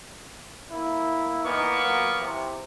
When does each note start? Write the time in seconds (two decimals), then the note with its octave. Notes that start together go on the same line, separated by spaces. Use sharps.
0.71 A#3 E4
1.45 A#2 E3 A#3 B3 D#4 C#6
1.84 A#2 F#3
2.20 C3 E3